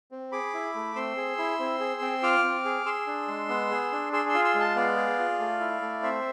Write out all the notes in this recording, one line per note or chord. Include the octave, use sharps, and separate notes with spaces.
C4
G#4 B5 D6
E4
A3
C4 C6 E6
G#4
E4
C4
G#4
C4
F4 D6 F6
C4
G#4
G#4 C6 E6
D4
G#3
B3
G#4
D4
G#4 C6 E6
C6 E6
F4
C6 E6
G#3
A5 C6
B3 D5 F5
G#4
F4
A3
E4
A3
C4 C5 E5